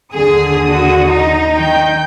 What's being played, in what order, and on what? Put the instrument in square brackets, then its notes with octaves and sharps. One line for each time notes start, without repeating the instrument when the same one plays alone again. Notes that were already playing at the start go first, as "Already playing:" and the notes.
[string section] D#2 D3 D#6 [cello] G#4
[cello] F#4
D#4
[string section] D#3 G5 G6